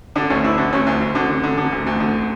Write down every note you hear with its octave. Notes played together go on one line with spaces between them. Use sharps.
D3 D4
D2 C#4
D2 E4
D3
D2 C#4
D2
D2
D3
D3
D3
D3
D2
D2
D3